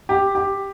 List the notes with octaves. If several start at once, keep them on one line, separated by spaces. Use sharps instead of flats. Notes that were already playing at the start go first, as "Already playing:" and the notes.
G4
G4